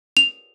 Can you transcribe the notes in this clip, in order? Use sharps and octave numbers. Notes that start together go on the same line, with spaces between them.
F7